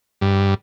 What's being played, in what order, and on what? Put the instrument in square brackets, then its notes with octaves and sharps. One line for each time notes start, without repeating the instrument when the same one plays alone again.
[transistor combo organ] G2